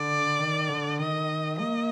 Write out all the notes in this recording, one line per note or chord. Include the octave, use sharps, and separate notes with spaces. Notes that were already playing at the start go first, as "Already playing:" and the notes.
Already playing: D3 D5
D#3
D3
D#3 D#5
A#3 D#5